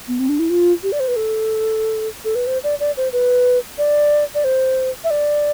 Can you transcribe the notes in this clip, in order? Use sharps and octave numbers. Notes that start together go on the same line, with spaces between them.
B3
C4
D4
E4
F4
G4
D5
C5
B4
A4
A4
B4
C5
D5
D5
C5
B4
D5
D5
C5
E5
D5